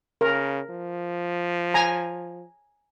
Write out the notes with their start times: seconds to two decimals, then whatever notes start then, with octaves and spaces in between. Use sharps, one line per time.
0.21 C#3 A#4
0.70 F3
1.74 G#5 A#5